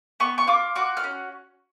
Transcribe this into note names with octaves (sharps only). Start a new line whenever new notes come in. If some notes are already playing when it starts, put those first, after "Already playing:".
B3 C#6
C#6
F4 D6
F#4 D6
F6
C#4